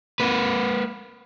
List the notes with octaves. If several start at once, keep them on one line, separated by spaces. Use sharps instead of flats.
A#3 B4